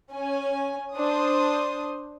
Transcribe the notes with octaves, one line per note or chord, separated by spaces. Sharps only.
C#4 G#5
D4 C5 D#6